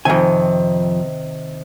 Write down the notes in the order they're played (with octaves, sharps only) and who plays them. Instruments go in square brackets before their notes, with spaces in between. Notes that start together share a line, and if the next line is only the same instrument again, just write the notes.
[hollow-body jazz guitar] F2 G#5 [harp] C3 D#3